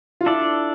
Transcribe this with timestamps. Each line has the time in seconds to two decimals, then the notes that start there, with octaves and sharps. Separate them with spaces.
0.21 F4
0.26 D4 E4 A4 D5